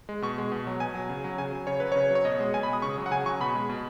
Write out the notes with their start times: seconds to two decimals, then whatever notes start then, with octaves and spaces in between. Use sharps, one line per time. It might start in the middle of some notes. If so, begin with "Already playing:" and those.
0.09 G#3
0.22 B2 C#6
0.38 G#3
0.52 B2
0.67 F#3
0.80 B2 G#5
0.95 F#3
1.09 C#3
1.24 F#3
1.38 C#3 G#5
1.52 F#3
1.67 C#3 C#5
1.80 F#3 B4
1.92 C#3 C#5
2.11 F#3 C#5
2.25 B2 D#5
2.40 G#3
2.54 B2 G#5
2.63 B5
2.69 G#3 D#6
2.82 C#3 C#6
2.98 F#3
3.06 F#5
3.11 C#3 G#5
3.26 F#3 C#6
3.40 B2 B5
3.55 G#3
3.69 B2